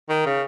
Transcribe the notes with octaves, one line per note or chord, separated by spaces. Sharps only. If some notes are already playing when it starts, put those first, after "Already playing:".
D#3
C#3